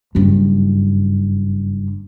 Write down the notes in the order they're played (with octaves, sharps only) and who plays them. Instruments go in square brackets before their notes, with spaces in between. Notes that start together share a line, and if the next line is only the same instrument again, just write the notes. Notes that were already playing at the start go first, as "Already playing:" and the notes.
[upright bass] F#1 G2